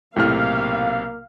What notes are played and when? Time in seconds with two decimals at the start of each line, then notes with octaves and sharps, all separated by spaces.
0.16 B1 A2 C3 A#3 F5 F6